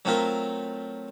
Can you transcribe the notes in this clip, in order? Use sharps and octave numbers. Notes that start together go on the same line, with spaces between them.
F#3 A3 C4 F4 A#4 E5